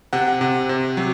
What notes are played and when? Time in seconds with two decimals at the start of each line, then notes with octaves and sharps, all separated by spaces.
0.13 C3 F#5
0.41 C3
0.69 C3
0.97 F#3